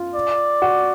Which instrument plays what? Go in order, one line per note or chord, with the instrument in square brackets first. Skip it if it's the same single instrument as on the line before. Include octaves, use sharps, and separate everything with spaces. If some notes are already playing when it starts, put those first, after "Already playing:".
Already playing: [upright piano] F4
[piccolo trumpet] D5
[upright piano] F#4